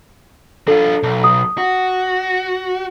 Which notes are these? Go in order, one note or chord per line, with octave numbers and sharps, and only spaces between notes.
D4 F4 A4
B1
D#6
F#4